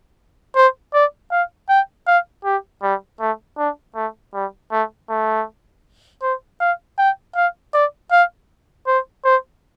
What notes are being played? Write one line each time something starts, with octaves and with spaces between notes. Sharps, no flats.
C5
D5
F5
G5
F5
G4
G3
A3
D4
A3
G3
A3
A3
C5
F5
G5
F5
D5
F5
C5
C5